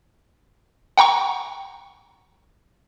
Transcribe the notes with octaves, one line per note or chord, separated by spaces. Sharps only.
F#5 G5 A#5 C#6